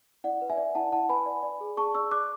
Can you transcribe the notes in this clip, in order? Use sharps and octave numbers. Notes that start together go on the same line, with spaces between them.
E4 D5 F#5
B4
E5 G#5
D5
E4 F#5 A5
E4 F#5 A5
B4 G#5 B5
D5
D5
G#4
G#4 A5 C#6
D5 C#6 E6
D5 D6 F#6